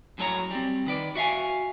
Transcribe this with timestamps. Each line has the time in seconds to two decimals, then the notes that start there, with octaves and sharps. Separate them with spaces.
0.18 F#2 A2 F#3 A4 C#5 A#5
0.51 G3 C4
0.86 D#3 B4 D5
1.15 F#4 E5 F5 G#5